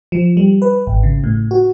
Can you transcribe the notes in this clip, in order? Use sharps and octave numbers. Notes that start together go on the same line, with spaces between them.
F3
G3
B4
G#1
C#3
A2
F#4